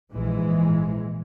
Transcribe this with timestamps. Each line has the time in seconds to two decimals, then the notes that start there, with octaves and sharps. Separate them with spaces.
0.12 A#1 G#2 E3 G#3